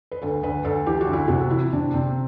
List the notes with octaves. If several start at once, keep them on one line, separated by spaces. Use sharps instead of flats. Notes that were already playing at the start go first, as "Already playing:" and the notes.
B4
D2 A4
D2 B4
D2 A4
E3 G4
F#4
D2
E4
C3 F#4
E3 E4
C3 D4
C3 C4